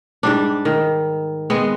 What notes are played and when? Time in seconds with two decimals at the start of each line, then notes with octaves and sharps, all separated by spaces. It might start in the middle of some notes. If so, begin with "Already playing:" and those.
0.23 G#2 G3 D4
0.65 D#3
1.50 G#3 B3 C4